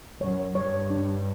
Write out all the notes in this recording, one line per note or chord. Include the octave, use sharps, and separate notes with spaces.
F#2 C#5
G2 C#5
D4